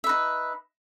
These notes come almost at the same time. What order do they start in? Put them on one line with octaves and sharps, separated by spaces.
E5 B4 D#4